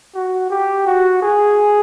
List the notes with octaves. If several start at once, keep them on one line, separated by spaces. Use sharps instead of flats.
F#4
G4
F#4
G#4